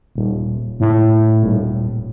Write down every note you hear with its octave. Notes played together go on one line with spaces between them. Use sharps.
D#1
A2
D#1